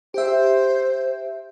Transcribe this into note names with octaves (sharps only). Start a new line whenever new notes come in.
G4 C5 E5